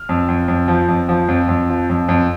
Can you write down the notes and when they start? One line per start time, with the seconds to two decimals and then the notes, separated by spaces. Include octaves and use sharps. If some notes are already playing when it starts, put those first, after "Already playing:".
Already playing: F6
0.09 F2
0.29 F2
0.48 F2
0.68 F3
0.89 F2
1.09 F3
1.28 F2
1.49 F2
1.70 F3
1.90 F2
2.09 F2